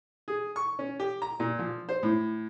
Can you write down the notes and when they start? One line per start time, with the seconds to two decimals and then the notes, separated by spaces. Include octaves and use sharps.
0.28 G#4
0.56 C#6
0.79 C#4
1.00 G4
1.22 A#5
1.40 A#2
1.59 F3
1.89 C5
2.03 A2